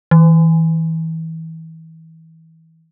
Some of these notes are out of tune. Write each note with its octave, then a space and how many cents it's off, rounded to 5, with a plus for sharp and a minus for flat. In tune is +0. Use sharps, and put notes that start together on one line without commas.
E3 -30